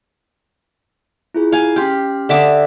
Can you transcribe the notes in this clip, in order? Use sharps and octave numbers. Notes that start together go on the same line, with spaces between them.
E4 F4 G#4
F5 G#5
C#4 G4 C6 F6
D3 D5 E5 D6 D#6